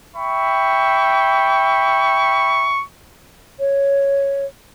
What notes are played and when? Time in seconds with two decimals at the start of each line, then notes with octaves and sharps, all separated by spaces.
0.17 E5 G5 B5 C#6
3.58 C#5